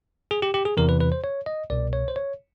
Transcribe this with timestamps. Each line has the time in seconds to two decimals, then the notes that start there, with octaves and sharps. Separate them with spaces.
0.31 G#4
0.42 G4
0.54 G4
0.65 G#4
0.77 E2 C3 E3 A#4
0.89 B4
1.00 B4
1.12 C5
1.24 C#5
1.46 D#5
1.70 C2 B2 D5
1.93 C#5
2.08 C5
2.16 C#5